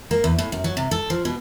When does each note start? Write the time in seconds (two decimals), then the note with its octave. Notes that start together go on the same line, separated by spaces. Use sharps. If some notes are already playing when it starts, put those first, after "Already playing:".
0.11 A#3
0.24 E2
0.38 A2
0.52 F#2
0.64 F#3
0.77 C3
0.91 A4
1.10 F3
1.25 B2